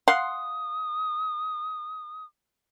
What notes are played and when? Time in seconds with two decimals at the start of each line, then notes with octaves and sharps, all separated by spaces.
0.08 F5 F#5 C6 D#6